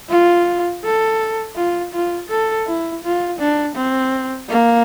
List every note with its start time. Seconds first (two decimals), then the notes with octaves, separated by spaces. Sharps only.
0.10 F4
0.84 A4
1.56 F4
1.93 F4
2.29 A4
2.67 E4
3.04 F4
3.39 D4
3.76 C4
4.49 A#3